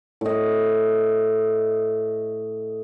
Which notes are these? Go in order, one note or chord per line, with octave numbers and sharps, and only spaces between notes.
A2 D#5